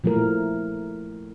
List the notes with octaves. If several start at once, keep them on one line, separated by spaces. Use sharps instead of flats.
A#2 F3 A3 E4 A#4